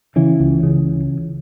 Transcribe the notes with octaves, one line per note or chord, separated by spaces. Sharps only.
C#3 E3
C#2
C#3